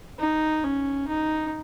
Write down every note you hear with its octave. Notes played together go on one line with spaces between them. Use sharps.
D#4
C#4
D#4